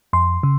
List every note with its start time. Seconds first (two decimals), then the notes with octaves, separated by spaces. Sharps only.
0.13 F2 C6
0.43 C#3